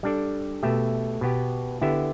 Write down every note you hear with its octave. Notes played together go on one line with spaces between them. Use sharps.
G3 D4 A4 D5
B2 A3 G4 E5
B2 B3 G4
D3 B3 E4 G4 E5